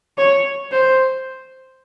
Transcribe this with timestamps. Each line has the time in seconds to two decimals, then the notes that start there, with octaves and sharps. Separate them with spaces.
0.18 C#5
0.72 C5